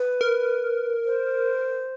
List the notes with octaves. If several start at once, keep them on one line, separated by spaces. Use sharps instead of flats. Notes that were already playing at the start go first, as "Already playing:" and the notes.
Already playing: B4
A#4
C5